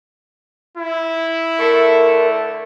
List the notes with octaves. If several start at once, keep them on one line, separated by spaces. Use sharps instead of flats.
E4
D3 A3 A#4